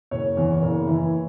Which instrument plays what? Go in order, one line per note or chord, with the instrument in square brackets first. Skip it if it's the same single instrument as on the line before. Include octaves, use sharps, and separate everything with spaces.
[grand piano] F#1 C#5
E2
F#1
E3